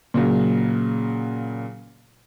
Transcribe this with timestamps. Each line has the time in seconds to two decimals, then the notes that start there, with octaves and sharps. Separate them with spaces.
0.14 A#2 C#3 F#3